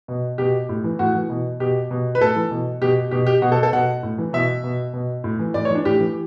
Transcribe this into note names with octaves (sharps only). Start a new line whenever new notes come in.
B2
B2 G4
A2
E3
A2 F#4
E3
B2
B2 G4
B2
B4
A2 A4
E3
B2
B2 G4
B2 G4
G4
B2 F#4
A4
A4
B2 F#5
A2
E3
B2 E5
B2
B2
A2
E3
A2 D5
C#5
E3 D4
A2 G4
E3